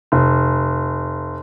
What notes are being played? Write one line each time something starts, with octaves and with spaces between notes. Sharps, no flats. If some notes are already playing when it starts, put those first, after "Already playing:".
F1